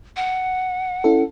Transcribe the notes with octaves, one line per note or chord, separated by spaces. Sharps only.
F#5
C#4 E4 A4